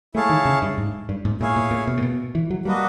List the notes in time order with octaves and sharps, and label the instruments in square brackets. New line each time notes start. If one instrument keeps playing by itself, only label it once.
[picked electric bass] A3 [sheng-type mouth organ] E4 G#4 C#5 F5 A5
[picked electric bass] D#3
C#3
G2
G#2
G2
G#2
[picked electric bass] A#2 [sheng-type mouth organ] E4 G#4 C#5 F5 G#5
[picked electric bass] A#2
A#2
B2
A#2
B2
E3
F#3
[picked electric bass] G3 [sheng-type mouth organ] A#3 D4 F#4 B4 D#5